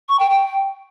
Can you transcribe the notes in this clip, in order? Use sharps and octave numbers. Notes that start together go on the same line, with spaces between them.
C#6
G5
G5